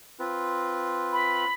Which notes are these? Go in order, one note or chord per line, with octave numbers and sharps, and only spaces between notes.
C4 F4 B4
B5